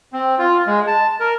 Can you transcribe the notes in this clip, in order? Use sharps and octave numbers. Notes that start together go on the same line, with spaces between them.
C4
F4
G#3
A5
A#4